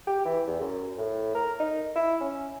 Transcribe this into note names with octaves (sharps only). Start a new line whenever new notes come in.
G4
E3
E2
F#2
A2
A#4
D#4
E4
C#4